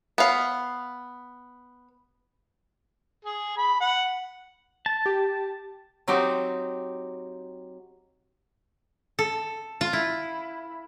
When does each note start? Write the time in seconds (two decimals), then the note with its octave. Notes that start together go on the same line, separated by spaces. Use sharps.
0.18 B3 F5
3.25 G#4
3.57 B5
3.81 F#5
4.86 A5
5.06 G4
6.08 F#3 C4 D#4 G4
9.19 A4
9.81 F4
9.93 E4